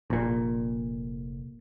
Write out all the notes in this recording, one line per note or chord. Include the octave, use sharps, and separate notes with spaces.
F1 A#1 A#2